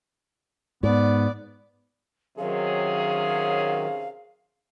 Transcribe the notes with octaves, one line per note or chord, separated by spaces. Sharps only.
G#2 B3 D5
C3 D#3 F#3 C#4 G#4 F5